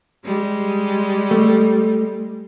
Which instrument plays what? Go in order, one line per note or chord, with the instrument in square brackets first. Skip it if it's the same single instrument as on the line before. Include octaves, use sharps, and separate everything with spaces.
[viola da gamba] G3 G#3
[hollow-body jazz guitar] A3